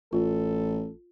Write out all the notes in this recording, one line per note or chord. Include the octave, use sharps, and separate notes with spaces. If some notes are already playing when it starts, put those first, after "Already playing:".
A1 F4 A4